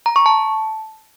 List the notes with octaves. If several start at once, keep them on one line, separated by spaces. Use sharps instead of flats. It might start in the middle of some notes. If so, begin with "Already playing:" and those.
A#5
C#6
A5